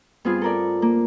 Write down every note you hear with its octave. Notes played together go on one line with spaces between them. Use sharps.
G2 B3 C4 F4 G#4
A4 A#4 D5
A#3